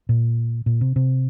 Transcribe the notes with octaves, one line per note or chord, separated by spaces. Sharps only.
A#2
A#2
C3
C3